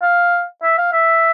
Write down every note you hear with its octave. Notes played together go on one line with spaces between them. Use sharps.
F5
E5
F5
E5